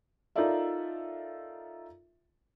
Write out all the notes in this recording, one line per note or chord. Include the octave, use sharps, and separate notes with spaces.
D#4 F4 A4 A#4 D5 E5